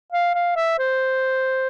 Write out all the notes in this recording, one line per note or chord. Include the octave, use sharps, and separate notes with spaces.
F5
F5
E5
C5